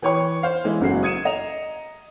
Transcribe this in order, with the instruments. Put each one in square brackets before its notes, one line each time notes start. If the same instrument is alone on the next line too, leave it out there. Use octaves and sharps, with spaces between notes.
[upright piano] E3 B4 C#5 G5 C#6
C5 F5
E3 G#3 E4
F#1 F#2 C#3 G#3 F#4 C7
D#6 G#6 C#7 D#7 E7
D#5 A#5 F7